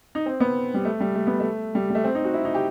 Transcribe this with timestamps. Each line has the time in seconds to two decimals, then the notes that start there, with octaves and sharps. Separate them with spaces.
0.15 D#4
0.26 C4
0.40 B3
0.74 G3
0.85 A3
1.00 G3
1.15 A3
1.27 B3
1.40 A3
1.75 G3
1.90 G3
1.95 A3
2.04 C4
2.15 D#4
2.24 F#4
2.34 E4
2.45 D#4
2.54 G4